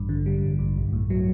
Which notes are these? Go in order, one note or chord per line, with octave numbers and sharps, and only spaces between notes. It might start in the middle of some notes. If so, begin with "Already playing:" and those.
Already playing: A1 G2
D3
G3
A1
G2
B1
A2
F#3